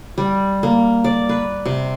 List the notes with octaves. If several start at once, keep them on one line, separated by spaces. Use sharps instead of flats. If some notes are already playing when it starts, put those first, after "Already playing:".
G3
A#3
D5
B4
C3